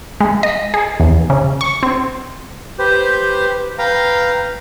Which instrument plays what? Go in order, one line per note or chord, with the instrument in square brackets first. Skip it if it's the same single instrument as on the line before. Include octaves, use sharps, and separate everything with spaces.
[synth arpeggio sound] G#3
D#5
G#4
E2
C#3
C#6
C4
[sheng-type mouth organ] G4 B4 C5
B4 F5 G5 A#5